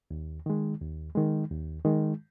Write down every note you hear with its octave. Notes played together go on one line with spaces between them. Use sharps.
D#2
D#3 G#3
D#2
D#3 G#3
D#2
D#3 G#3